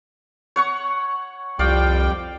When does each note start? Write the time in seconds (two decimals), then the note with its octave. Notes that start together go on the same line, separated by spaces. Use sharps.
0.56 C#5 F#5 C#6
1.59 C2 F2 G3 D5 F5 G5